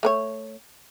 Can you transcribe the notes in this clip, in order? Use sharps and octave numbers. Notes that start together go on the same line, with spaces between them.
A3 A#4 C#5